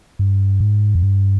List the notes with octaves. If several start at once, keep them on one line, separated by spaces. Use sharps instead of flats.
G2
G#2
F2
G2